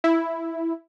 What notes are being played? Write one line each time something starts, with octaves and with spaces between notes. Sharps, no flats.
E4